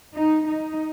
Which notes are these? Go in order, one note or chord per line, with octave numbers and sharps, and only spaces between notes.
D#4
D#4